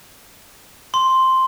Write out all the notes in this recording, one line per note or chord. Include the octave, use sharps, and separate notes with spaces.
C6